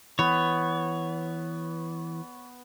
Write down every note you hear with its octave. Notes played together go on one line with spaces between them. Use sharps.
E3 B3 C#5